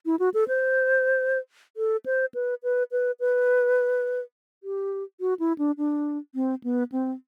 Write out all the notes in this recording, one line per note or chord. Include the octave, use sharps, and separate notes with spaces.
E4
F#4
A4
C5
A4
C5
B4
B4
B4
B4
G4
F#4
E4
D4
D4
C4
B3
C4